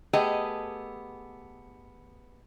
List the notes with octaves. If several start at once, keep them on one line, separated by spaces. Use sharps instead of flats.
A3 B3 G4 G#4 D#5